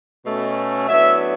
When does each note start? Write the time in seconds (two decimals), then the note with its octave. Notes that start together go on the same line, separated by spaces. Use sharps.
0.25 B2 A3 C#4
0.89 A2 F#3 B3 D4 E5